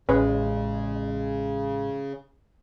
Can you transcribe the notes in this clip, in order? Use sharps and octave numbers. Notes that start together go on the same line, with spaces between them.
A1 C#3 G#3 C#4 B4